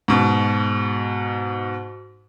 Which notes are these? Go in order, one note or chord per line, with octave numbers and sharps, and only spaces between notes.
G#2 B2